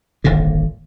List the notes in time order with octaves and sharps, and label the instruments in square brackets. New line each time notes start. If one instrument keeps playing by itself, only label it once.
[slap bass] D#1 G#1 A#2 D3